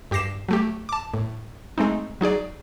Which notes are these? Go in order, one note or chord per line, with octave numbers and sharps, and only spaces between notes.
G2 G4 D6 A#6 C7 E7
F#3 A3 G4
A5 D6
A2
G#3 A3 C4 D#4
F#3 D#4 G#4 D5